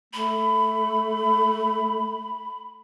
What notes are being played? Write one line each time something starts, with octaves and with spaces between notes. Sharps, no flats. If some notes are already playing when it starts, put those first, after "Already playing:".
A3 B5